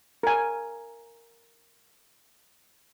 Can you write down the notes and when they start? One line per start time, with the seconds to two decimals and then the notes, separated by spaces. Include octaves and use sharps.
0.23 A#4 G#5